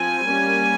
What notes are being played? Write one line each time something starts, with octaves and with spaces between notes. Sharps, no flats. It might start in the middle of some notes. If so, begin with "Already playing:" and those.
Already playing: F3 C4 G#5
G3 A#3 C#4